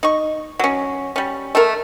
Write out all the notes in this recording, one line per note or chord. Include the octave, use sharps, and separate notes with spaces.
D#4 C#6
F#3 C#4
G3 C#4
A3 A4 A#4